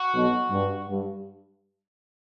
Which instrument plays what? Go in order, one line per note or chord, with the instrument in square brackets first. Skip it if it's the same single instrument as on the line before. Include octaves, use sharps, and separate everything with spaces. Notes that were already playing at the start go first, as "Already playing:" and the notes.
Already playing: [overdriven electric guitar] F#4
[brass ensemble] B1 B2
G2
G2